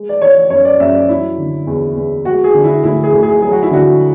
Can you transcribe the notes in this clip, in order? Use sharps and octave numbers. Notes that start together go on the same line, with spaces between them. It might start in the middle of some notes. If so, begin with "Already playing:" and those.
Already playing: G#3
D5
E3 C#5
F#2 C#5
D5
F#2 E5
D5
F#3 E4
D3
E2
E2
G#3 F#4
G#4
D3
E4
D2 E4
G#4
D2
G#4
F#3 G#4
F#4
E4
D3 F#4